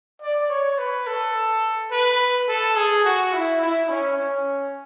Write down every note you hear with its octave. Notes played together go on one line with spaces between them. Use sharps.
D5
C#5
B4
A4
B4
A4
G#4
F#4
E4
E4
C#4
C#4